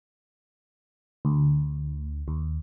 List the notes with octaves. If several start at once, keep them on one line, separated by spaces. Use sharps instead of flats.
D2
D#2